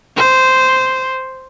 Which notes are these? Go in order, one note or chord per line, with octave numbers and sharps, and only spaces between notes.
C5